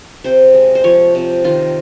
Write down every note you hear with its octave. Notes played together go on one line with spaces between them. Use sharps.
C3 C5
G#3
C5
F3 C#5
C3
D#3 F4